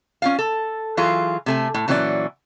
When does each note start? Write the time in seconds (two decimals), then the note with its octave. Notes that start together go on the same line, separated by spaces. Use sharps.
0.22 C#4 F4 F5
0.39 A4
0.97 E3 F#3 F4 G#4
1.46 C3 A3 G#5
1.74 A2
1.88 A#2 E3 F#3 C#4 E4 D5